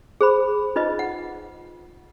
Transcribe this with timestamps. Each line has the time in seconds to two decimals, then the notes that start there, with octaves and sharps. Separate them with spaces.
0.21 G#4 C5 B5
0.76 D#4 F4 B4 D#5
0.99 F#5